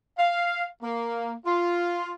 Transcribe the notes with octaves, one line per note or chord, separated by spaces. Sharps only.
F5
A#3
F4